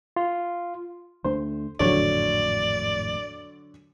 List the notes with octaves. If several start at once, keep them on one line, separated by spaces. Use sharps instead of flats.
F4
D2 A3 D4 C5
G#1 F2 A2 D3 F#3 C#5 D5